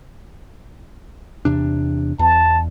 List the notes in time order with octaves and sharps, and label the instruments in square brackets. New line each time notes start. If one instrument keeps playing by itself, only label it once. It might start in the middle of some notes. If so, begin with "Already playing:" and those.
[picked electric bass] E2 C3 D4
[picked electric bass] E2 [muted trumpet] A5